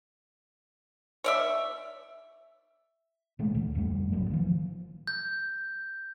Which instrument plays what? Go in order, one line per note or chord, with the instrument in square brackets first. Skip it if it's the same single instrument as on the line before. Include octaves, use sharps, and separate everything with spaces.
[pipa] C#5 D5 E5
[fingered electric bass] A#2 E3 G#3 A3
D2
F1 G2 G3 A3
A1 F#3 A#3
D#3 F3
[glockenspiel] G6